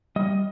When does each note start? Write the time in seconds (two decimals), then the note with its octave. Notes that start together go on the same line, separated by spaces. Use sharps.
0.16 G3 D#5